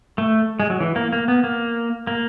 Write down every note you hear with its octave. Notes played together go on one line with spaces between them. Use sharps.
A3
G#3
F#3
E3
A#3
A#3
B3
A#3
A#3